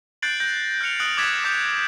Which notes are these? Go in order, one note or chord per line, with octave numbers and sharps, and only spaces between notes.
F#6 G6 A6 C7 D7 F#7
G6 A#6
F6 G6 C#7 F7
D#6 F#6 D7 F#7
D6 D#6 G#6 A6 B6 E7
D6 D#6 G6 A6 C#7